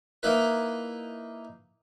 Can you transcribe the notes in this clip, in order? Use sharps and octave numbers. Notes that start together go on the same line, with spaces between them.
A#3 D#4 E4 B4